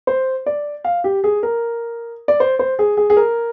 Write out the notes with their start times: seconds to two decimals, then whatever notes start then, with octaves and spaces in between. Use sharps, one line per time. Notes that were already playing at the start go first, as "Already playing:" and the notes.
0.07 C5
0.46 D5
0.84 F5
1.04 G4
1.24 G#4
1.43 A#4
2.28 D5
2.40 C5
2.59 C5
2.79 G#4
2.97 G#4
3.10 G#4
3.17 A#4